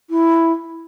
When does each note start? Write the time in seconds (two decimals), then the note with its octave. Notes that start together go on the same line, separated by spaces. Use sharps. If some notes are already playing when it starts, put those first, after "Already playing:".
0.10 E4